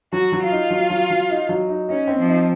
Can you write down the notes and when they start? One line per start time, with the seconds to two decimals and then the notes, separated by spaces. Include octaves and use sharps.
0.12 F#3 F#4
0.32 F#3
0.41 F4
0.51 D#4
0.70 F#3
0.90 F#3
1.10 F#3
1.30 D#4
1.49 F#3
1.69 D#4
1.89 C#4 D#4
2.08 C4
2.18 F3
2.28 D#4